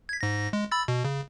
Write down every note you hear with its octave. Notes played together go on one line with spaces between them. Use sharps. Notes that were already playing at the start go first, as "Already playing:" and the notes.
G#6 B6
G#2 A#6
G#3
B5 E6 A6
B2
C#3